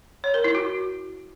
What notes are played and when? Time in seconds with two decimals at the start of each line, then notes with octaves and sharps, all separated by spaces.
0.24 C#5
0.34 A#4
0.44 E4
0.55 F#4